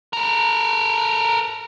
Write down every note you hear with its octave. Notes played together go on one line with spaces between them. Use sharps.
A4 A#4